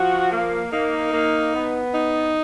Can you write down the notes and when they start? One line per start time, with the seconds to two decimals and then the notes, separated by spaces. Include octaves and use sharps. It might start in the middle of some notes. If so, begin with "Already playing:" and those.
Already playing: F3 F#4
0.31 A#3
0.73 A#3 D#4
1.12 A#3
1.54 B3
1.94 D#4